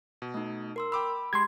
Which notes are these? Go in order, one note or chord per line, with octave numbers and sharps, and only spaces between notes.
B2
A3 D#4
A#4 C6 E6
G5 B5 D6 E6
G#3 G4 C6 G#6